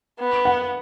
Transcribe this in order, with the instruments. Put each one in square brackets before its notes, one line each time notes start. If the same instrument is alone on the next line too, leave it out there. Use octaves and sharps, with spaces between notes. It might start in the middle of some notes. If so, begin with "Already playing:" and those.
[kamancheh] B3
[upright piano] F#5